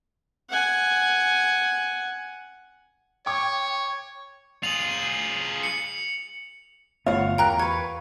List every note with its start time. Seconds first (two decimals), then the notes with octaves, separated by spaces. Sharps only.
0.50 F#5 G#5
3.26 C#5 G5 C#6 D6
4.63 F4 G#4 F7 F#7
5.63 C#7
7.06 G1 A3 B3 F4 C#5 F5 F#5
7.38 E2 A#4 G5 A#5 F#6
7.59 B4 C#6 G#6